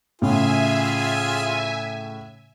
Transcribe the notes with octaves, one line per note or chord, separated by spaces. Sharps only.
A2 C#3 F4 G#4 E5 G#5